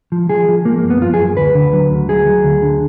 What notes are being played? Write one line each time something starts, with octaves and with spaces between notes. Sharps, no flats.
F3
F3 G#4
F3
F3 A#3
A#3
F#2
B3
F3 F4
G#4
F#2
D2 B4
D3
F#3
D2
F#3 G#4
F#3
D2
D3